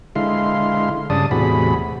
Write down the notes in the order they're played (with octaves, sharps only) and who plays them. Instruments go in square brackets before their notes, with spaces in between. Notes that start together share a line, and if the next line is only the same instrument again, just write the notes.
[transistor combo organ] D3 G#3 E4 F5 C6
G2 C#3 D5 A5 D#6
E2 A2 C3 F#4 G#4 B5